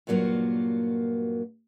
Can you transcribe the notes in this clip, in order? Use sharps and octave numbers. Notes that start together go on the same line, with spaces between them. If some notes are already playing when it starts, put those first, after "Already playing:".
G2 A#2 F#3 A#3 F4 F#4